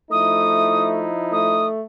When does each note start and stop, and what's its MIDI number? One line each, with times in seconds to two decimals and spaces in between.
0.11 1.73 53
0.11 1.09 57
0.11 1.73 63
0.11 1.73 64
0.11 0.88 87
1.32 1.84 57
1.32 1.67 87